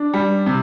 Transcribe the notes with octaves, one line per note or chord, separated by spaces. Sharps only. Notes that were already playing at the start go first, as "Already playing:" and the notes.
Already playing: D4
G3
C3